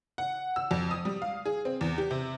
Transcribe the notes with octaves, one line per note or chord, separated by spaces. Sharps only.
F#5
E6
F2
D#6
G3
F5
G#4
C4
E2
G4
C3